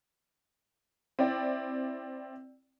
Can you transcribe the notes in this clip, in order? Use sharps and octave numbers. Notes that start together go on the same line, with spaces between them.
C4 E4 D5 G5